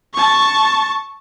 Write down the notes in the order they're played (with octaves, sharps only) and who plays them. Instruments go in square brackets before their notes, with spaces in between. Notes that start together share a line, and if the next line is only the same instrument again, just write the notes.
[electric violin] A5 C#6